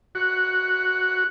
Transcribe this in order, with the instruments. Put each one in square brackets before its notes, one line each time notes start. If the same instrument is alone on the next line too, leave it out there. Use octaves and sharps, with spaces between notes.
[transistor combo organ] F#4